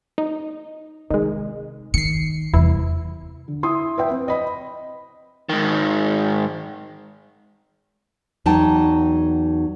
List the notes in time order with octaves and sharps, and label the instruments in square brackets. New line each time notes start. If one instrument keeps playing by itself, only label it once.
[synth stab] D#4
[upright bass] C3 [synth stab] D#3 G#3
[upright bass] D#3 [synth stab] C7 C#7
[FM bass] E2 [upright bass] C3 G3 [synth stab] E4
[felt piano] D3
E4 C6 D#6
B4 E5 G5
C4 B4
D#5 B5
[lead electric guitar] G#2 D#3
[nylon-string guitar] E2 F#3 D#4 G5 A5